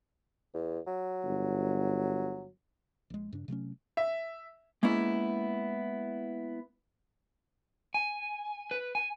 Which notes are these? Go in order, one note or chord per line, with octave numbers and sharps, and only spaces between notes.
E2
F#3
G1
A#1 G#3
G2 C#3 D4
C3 F#3 A3 C#4
E5
G#3 A#3 B3 C#4 E4
G#5
B4
G#5